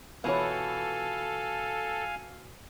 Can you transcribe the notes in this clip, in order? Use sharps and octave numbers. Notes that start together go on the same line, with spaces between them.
B2 E3 B3 F4 A4 C#5 F5 G#5